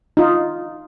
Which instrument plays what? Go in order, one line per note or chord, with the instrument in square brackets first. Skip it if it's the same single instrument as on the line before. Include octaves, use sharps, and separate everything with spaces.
[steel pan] D#4 F4